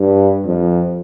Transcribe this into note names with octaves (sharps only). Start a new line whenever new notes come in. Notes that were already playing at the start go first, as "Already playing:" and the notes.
Already playing: G2
F2